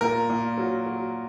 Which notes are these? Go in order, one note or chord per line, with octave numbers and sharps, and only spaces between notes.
A#2 A#4
A#2
F#3
F#3